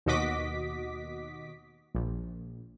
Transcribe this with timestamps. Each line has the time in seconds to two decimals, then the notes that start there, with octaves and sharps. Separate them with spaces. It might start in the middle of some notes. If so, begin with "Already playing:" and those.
0.06 D#2 B2 F#4 D#5 D6 B6
1.95 A#1